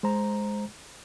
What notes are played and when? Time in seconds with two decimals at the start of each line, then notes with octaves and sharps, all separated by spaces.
0.03 G#3 C5 A#5